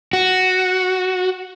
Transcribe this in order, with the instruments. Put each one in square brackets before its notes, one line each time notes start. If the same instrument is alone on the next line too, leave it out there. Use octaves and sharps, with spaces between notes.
[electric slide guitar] F#4